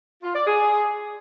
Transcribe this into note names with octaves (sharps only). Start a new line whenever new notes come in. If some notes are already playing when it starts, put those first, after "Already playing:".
F4
D5
G#4